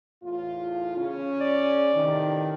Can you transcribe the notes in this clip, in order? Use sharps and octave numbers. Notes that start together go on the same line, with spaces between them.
E2 A2 F4
C#3 C#4
D5
A2 C3 D#3